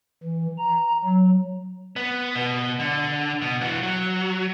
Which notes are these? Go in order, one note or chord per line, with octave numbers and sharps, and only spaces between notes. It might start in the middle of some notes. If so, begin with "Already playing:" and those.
E3
A#5
F#3
B3
B2
D3
B2
E3 F#4
F#3